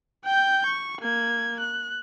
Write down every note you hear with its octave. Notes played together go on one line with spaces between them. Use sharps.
G5 G6
C#6
A#3 G#6
F#6